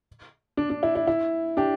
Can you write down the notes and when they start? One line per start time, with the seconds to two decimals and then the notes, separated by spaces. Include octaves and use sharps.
0.57 D4
0.70 D4
0.83 E4
0.95 E4
1.07 E4
1.57 D4 G4